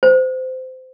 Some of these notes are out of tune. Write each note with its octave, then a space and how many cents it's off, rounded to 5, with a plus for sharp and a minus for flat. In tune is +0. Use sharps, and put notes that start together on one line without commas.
C5 -20